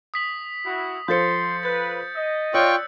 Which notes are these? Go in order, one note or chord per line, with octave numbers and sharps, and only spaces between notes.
D#6 B6 F#7
E4 F#4
F3 A4 C5 C6 G6 A6 C#7
B4 G6 A6
D#5
F4 C#5 D5 G5 C#6 E6 F#6 C#7